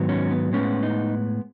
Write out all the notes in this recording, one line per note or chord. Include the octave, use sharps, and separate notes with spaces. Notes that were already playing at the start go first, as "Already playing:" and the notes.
Already playing: G#2 D#3 F#3 B3
C#4
B3
A2 G#3 B3 C#4
D#4